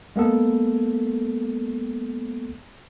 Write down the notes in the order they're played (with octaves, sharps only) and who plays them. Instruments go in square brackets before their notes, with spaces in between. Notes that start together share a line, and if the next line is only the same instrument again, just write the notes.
[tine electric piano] G#3 A#3 B3 A4